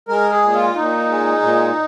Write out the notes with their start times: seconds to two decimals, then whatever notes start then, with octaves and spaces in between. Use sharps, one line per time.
0.08 G#3 A#4
0.31 G#4
0.42 A#2
0.53 F4
0.75 A#2 D#4
1.09 G#3
1.42 A#2